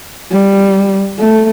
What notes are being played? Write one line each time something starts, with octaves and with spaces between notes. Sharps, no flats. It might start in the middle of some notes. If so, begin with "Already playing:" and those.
G3
A3